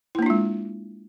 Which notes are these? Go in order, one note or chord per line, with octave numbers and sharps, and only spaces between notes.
G#3 A#3 D4 E4 F4